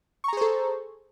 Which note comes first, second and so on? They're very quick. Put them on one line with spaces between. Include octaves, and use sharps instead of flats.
C#6 A#5 G#4 C5 A4